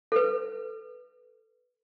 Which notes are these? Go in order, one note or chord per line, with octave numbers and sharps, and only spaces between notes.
A4 B4